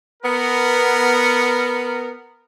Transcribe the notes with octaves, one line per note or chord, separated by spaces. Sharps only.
B3 A#4